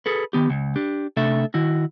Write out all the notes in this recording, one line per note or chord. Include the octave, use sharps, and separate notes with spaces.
G#4 A4 B4
D#3 B3 G4
C#2
D4 G4
C3 A3 D4 A4 E5
D#3 E4 F#4